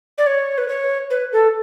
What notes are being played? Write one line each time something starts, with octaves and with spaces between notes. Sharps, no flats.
D5
C#5
B4
C#5
B4
A4